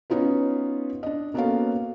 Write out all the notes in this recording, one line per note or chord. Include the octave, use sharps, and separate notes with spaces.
B3 C#4 D#4 F4 B4
D4 D#5
A#3 B3 C#4 F#4 A4 F5